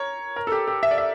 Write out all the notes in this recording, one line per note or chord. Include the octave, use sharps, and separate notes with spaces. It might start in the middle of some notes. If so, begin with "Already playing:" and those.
Already playing: A#4 C#5
A#4
A4
G4
G4
E5
D5
E5